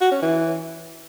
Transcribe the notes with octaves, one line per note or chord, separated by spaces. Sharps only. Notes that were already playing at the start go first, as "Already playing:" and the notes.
F#4
C#4
E3